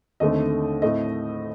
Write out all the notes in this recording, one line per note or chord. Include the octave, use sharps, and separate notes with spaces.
D#2 D3 A3 C4 D#5
A2 A3 C4 D#5